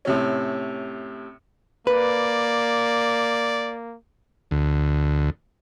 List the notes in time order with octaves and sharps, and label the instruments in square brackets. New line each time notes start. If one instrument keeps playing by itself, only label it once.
[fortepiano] A2 C3 C#4
[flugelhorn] A#3 [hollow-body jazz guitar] B4 [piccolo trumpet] D5
[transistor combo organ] D2